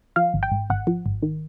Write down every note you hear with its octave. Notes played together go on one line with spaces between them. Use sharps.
F3 F5
G#1
G5
G#2
G#1 F#5
F3
G#1
D#3